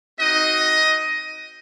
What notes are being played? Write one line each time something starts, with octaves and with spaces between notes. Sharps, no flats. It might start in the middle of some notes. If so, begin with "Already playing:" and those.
C4 D#4 F#4 D#5